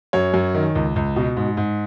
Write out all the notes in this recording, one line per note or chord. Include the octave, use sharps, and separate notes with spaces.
F#2 C#5
F#2
D#3
C#2
C#2
B2
G#2
G#2